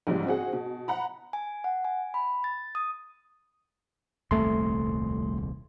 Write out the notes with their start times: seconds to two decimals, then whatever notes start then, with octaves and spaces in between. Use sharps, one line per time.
0.07 A#1 G#2 C#3 E3 G3
0.26 C4 F#4 G#4 F#5
0.53 B2
0.88 F#5 A#5 B5
1.33 G#5
1.64 F#5
1.85 G#5
2.14 B5
2.44 A6
2.75 D#6
4.31 D#1 C2 F2 A3 C6